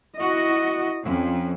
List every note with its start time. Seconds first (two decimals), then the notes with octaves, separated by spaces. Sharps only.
0.18 E4 F#4 D#5
1.05 F2 C#4